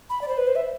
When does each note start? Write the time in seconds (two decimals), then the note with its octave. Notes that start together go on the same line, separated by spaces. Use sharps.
0.10 B5
0.21 D5
0.28 C5
0.38 B4
0.47 C5
0.56 E5